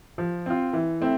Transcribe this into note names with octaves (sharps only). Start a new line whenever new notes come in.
F3
C4 F4
E3
A3 C4 E4